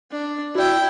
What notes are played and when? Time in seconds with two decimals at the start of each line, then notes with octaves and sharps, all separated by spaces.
0.11 D4
0.55 E4 F#4 D5 G5